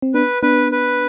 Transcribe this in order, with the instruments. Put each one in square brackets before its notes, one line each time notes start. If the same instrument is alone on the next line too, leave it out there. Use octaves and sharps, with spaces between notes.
[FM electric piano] C4
[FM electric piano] B3 D4 [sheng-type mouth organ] B4
[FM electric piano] B3 D4 [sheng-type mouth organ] B4
[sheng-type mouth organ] B4